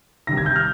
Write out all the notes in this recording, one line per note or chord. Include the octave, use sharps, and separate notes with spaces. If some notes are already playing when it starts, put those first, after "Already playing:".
C3 D#3 G3 A#6
G#6
G6
F6